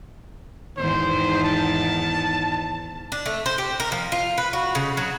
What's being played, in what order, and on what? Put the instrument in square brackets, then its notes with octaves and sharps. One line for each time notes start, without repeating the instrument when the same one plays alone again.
[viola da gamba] E2 G#2 D#3 [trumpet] C5
[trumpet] A5
[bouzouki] D4
A3
C5
G4
A#4
F3
F4
B4
F#4
C#3
F#3